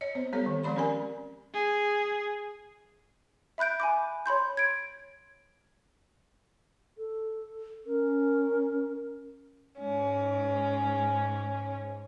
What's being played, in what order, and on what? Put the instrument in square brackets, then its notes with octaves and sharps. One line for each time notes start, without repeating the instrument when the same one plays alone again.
[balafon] C#5 D#5
B3 C4 C5
G3 B3 G4 A4 C#5
D#3
F3 G#3 C4 D5 B5 C6
C#4 G4 A#4 D5 G#5
[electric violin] G#4
[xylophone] E5 B5 F#6 G6 D7
G#5 B5 D6
C#5 B5 C6 G6
G#6 D7
[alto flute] A4
[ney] C#4 [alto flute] A#4
[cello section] G#2 [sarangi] C#4